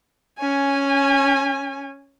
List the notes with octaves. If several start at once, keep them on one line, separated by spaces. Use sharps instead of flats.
C#4 G#5